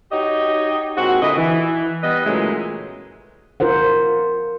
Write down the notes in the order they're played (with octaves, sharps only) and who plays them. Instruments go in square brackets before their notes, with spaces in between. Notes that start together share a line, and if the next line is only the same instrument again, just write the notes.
[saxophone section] D#4 F#4 G4 C#5 D#5
A#2 G#3 C4 F#4
A#2 D3 C4 E4 D#5
E3
G3 B3 B4 D#5
A#2 C#3 E3 F#3 G#3 A3
[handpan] F4 A#4 C5 F#5